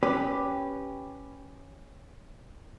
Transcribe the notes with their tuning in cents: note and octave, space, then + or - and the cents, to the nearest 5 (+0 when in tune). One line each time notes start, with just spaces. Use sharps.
C#4 +0 G4 +0 B4 +0